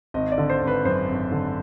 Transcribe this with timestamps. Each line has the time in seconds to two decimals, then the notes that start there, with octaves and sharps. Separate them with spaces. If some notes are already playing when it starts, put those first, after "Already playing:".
0.14 G#1 D#5
0.32 D5
0.38 D3
0.50 C5
0.61 G#1
0.67 B4
0.85 F#2 C5
1.09 G#1
1.32 D3